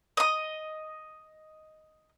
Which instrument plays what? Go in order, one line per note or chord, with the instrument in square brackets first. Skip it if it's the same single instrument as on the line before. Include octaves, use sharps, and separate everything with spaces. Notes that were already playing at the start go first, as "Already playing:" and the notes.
[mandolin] D#5 D#6